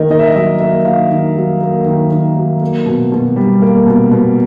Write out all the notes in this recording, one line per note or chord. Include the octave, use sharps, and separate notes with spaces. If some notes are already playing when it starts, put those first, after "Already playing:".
Already playing: D#3 A#3 A#4 D#5
D#3 D#5
E5
D#5
F#3 E5
A#3 E5
D#3 F5
D#3
F#3
A#3
D#3
D#3
F#3
A#3
B2
B2
G3
A#3
B2
B2